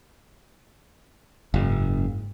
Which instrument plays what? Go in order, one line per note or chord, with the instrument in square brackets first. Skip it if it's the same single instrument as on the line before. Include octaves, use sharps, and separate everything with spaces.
[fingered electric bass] F#1 [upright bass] G#2 G#3